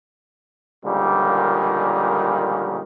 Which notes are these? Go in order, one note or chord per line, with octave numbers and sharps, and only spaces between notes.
C#2 A#2 D3 D#3 F3 G3